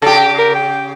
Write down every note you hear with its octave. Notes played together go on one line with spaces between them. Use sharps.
C#3 G4 A4
G5
A#4
G5